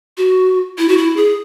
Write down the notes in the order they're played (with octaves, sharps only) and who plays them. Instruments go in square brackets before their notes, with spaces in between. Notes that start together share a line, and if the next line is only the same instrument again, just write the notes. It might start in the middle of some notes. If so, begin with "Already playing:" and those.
[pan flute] F#4
E4
F#4
E4
G#4